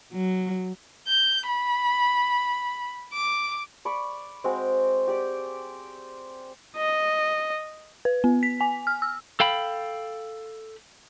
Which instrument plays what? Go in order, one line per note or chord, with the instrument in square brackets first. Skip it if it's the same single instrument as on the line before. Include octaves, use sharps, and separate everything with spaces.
[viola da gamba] F#3
[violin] G6
B5
D6
[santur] D5 B5 C#6
G#3 C4 F#4
G4 D5
[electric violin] D#5
[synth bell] B4
B3
B6
G#5
F6
E6
[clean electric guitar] A4 F5 G5 B5